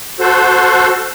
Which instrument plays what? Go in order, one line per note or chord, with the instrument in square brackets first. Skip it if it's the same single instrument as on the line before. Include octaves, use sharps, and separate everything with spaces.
[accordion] F#4 A4 C5